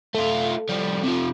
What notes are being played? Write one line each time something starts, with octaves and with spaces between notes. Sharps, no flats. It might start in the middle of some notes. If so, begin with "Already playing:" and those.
A3 F4 A4
F3 G3
C3 F3